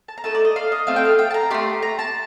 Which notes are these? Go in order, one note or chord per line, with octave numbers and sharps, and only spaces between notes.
A5
A#5
A3 D#4 A4 A5
D5
D#5
F5
D#5
A3 C4 F4 A4 F5
G5
F5
G5
A5
A#5
A3 D4 G4 C6
A#5
A5